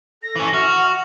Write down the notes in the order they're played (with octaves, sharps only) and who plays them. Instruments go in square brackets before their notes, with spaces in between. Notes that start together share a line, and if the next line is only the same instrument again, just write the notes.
[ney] A4 [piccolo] A#6
[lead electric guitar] E3 C#4
[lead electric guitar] F#4 [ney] E5 [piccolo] F6
[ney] F#5